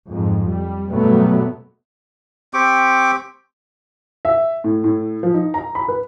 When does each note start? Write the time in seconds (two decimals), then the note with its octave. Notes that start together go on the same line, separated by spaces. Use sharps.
0.11 F2 G#2
0.46 G3
0.90 G2 B2 F#3 G3 A3 B3
2.54 C4 G4 C#6 D6
4.25 E5
4.64 A2
4.84 A2
5.23 F3
5.34 D#4
5.54 A#5
5.75 B5
5.88 B4